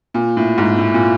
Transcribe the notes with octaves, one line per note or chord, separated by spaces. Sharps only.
A#2
A2
G#2
A2
A#2